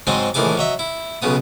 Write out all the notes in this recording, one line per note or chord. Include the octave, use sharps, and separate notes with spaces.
G#2 F#3 G#3 C4 D#5 D#6
A#1 A2 D#3 E3 G#4 D6
F#3 D#5 E5
E4
B1 C#3 B3 D#6